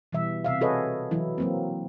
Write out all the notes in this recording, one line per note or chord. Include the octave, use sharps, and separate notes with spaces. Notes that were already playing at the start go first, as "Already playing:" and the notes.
B2 E3 G3 E5
C3 E5 F5
F#4 G#4 A4 B4 C#5 D#5
E3 F#3 E4
F#3 A#3 C4